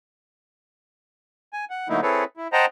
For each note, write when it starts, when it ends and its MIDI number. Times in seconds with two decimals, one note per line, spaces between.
1.53 1.65 80
1.70 1.88 78
1.89 2.01 50
1.89 2.01 54
1.89 2.01 57
1.89 2.01 58
1.89 2.01 63
1.89 2.01 64
2.03 2.24 60
2.03 2.24 64
2.03 2.24 68
2.03 2.24 69
2.03 2.24 71
2.03 2.24 73
2.37 2.48 64
2.53 2.66 72
2.53 2.66 75
2.53 2.66 78
2.53 2.66 79
2.53 2.66 81
2.53 2.66 82